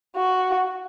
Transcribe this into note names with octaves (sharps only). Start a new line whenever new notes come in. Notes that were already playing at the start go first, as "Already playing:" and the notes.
F#4